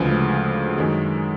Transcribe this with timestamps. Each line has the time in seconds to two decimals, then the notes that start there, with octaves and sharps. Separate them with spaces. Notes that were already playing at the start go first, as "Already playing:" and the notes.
Already playing: D2 C#3 F3 G#3 B4
0.78 F#2 D#3 G#3